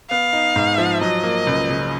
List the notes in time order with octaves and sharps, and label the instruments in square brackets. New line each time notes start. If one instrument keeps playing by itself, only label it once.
[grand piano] B3 [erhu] F5
[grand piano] D#4
G#2
F3
[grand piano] F#3 [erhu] D#5
[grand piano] A#3
C#2
C#3